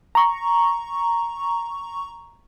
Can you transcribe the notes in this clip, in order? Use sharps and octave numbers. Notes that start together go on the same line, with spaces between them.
A#5 C#6